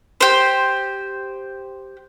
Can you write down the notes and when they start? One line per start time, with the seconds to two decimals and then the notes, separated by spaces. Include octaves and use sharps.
0.21 G4 C5